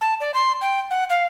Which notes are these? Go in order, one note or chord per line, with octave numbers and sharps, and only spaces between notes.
A5
D5
C6
G5
F#5
F5